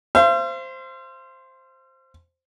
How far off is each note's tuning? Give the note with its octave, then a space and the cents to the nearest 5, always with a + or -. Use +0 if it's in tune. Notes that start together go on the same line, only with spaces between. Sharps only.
C5 +0 F5 -45